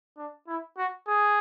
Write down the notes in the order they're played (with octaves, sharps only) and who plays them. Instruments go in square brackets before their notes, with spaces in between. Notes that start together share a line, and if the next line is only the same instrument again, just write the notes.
[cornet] D4
E4
F#4
G#4